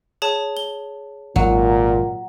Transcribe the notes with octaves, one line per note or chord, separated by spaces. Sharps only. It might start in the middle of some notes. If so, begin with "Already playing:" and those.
G#4 C#5 A5
G7
G#1 A#2 F#3